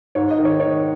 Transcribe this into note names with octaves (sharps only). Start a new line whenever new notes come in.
G#2 C#5
D#5
D#3
C#5
D#3 C#5